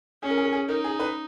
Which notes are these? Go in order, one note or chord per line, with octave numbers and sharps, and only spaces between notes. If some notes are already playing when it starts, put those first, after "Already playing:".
C#4 G#4
A#4
G#4
A#4
G#4
D#4 A#4
G#4
B4